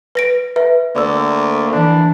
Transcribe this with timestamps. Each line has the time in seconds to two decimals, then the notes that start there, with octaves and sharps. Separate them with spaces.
0.15 B4 A#6 D7
0.56 B4 E5
0.96 D2 A#3 D5 E6
1.73 E3 D4